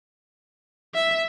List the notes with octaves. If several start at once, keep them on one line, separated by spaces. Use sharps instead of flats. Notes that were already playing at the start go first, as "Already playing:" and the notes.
E5